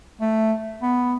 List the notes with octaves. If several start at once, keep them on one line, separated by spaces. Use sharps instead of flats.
A3
B3